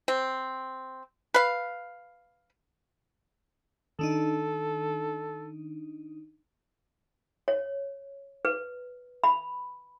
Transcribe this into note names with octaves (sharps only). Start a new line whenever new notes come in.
C4
B4 F5
D#3 D4 D#4 A4
C#5
B4
B5